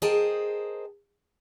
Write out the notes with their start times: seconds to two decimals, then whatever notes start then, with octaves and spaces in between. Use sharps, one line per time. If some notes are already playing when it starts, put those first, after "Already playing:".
0.02 G#4 A#4 C5 D#5 G5 A5